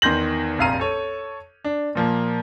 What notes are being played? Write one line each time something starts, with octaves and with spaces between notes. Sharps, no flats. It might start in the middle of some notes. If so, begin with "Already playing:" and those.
E2 D#3 C6 G6 A#6 F#7
F1 A#1 F2 F5 A#5 D#7
A4 C#5
D4
A#2 F3 A#3